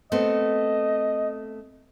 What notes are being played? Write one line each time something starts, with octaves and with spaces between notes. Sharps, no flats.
A3 B3 C4 D#5